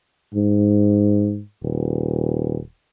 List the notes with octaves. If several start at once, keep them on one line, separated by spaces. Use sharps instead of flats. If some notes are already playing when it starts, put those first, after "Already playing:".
G#2
D#1